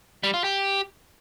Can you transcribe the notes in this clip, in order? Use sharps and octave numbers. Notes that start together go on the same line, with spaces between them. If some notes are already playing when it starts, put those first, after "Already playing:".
G3
F4
G4